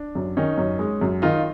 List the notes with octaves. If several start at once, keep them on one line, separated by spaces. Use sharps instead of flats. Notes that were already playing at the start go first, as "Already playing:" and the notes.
Already playing: D4
F#2
D#3 C#4 D#4
F#2
G#3
F#2
D#3 D#4 F4